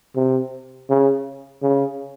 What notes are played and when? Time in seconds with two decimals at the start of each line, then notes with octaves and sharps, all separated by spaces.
0.16 C3
0.89 C#3
1.62 C#3